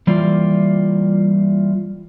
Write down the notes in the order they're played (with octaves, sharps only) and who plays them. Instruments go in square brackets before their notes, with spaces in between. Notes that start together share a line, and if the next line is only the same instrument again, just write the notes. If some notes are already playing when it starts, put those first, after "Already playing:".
[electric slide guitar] E3 G3 A#3 F4 D5